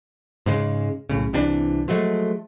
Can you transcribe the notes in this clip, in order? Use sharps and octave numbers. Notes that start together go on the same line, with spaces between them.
G#2 C#3 G#3
B1 A2 C#3
C2 C3 E3 D4
F3 F#3 G#3 A3